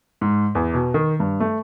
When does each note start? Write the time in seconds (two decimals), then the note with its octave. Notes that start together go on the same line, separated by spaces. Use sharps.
0.21 G#2
0.55 E2
0.74 B2
0.94 D#3
1.20 G2
1.40 A3